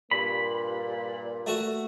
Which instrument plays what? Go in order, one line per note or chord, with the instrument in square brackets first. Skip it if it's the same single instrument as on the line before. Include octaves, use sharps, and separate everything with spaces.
[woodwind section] G2 A#2 [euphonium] A#3 [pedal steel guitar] B5
[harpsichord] A3 F#4